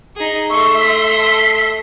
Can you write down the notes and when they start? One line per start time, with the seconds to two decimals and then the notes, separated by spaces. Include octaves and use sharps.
0.17 D#4 G#4
0.50 A3 E5 C6 C#6
0.80 B6